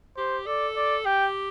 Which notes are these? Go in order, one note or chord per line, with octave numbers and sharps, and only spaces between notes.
G4 C5
A4 D5
D5
G4 G5